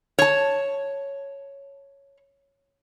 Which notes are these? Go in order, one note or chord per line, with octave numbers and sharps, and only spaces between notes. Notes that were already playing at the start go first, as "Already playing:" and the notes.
C#5 A5